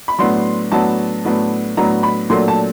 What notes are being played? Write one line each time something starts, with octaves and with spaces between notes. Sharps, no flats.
B5
A2 F#3 B3 D4 C6
A2 F#3 B3 D4 A5
A2 F#3 B3 D4
A2 F#3 B3 D4 A#5
B5
A#2 F#3 A3 D4 C6
A5